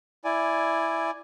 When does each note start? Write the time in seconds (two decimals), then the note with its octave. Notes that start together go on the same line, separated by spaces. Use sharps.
0.24 E4 D5 G#5